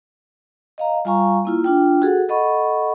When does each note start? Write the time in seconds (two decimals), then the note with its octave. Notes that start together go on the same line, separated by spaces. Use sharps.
0.78 D#5 F5 A#5
1.05 G3 F4 F5 G#5 A#5 C#6
1.45 A#3 E4 F4
1.64 D4 F4 G5
2.02 F#4 G#4 A4 F#5
2.29 A4 D#5 F#5 B5 C#6